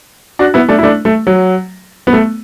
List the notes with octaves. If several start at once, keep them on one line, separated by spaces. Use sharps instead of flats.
D4 F#4
B3 E4
A3 D4
E4
A3 D4
A3
F#3
B3
A3